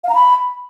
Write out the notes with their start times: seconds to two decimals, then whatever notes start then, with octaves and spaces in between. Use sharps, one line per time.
0.04 F5
0.09 A#5
0.15 B5